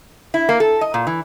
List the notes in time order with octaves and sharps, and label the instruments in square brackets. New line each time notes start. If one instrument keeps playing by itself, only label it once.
[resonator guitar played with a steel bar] E4
A#3
A4
D#5
A#2
E3